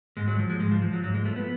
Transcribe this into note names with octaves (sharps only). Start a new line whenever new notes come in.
G#2 G#3
F#3
F3
G#3
G#2 G#3
F3
F3
F#3
G#2 F#3
G#3
F3 A3
B3